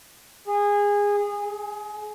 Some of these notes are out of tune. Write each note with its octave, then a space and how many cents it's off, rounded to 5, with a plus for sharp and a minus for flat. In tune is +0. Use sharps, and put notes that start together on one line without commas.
G#4 -20
G#4 +25